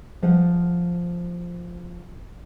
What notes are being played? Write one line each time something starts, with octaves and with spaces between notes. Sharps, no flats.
F3 C5 F#5